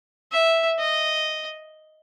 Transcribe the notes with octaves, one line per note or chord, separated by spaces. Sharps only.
E5
D#5